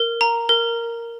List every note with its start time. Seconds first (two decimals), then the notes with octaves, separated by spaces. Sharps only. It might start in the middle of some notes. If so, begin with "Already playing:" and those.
Already playing: A#4
0.21 A#5
0.49 A#4